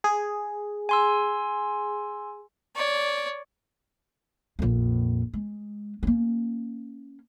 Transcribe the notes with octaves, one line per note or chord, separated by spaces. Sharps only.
G#4
G#5 C6 E6
C#5 D5
A#1 F2
G#3
A#3 C#4